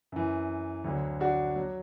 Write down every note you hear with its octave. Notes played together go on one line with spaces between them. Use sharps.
F#2 E3
D2 D3 F#3
D4 F#4
F#3